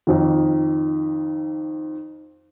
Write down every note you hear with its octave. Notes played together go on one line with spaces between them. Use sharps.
F2 D#3